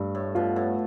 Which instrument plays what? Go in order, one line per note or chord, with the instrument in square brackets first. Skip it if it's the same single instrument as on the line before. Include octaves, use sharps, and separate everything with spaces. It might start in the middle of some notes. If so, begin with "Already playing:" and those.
Already playing: [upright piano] G2 [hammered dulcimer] A3
[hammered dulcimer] A2
[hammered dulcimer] B2 [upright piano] F4
[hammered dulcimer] A2